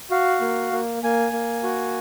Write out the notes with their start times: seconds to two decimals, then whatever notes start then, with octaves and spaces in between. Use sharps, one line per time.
0.11 F#4 F5
0.41 A#3
0.72 A#3
1.03 A#3 G#5
1.33 A#3
1.63 F#4